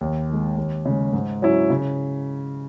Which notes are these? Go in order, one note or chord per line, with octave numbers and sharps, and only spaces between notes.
D#2
D#3 G#3
D#2
C#3 G#3
G#2
F#3 C#4 E4
C#3